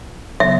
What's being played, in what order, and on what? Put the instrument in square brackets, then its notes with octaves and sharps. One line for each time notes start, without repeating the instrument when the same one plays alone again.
[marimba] C#3 F#3 B3 [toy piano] E5